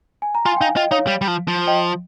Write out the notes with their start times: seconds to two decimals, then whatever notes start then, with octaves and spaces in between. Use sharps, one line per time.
0.22 G#5
0.35 A#5
0.45 F4 G#5 C6
0.57 G5
0.61 D#4 F5 G#5
0.76 F4 D#5 G5
0.91 D#4 C#5 F5
1.07 G3
1.21 G3
1.28 F3
1.48 F3
1.67 D#5 G5